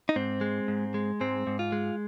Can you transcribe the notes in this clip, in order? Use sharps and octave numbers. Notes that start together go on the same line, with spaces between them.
D#4
G#2 C4
G#3
G#2
G#3
G#2 C4
G#2
F4
G#3